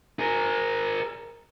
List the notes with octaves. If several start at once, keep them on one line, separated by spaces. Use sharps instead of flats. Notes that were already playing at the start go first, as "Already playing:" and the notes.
G#4 A#4